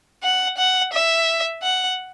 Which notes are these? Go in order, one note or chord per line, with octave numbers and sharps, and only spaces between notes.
F#5
F#5
E5
F#5